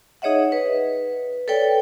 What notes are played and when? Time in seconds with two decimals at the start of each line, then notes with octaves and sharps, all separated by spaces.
0.22 D#4 G#4 C#5 D#5 E5 F#5
0.52 B4
1.48 A4 B4 C#5 D5 G5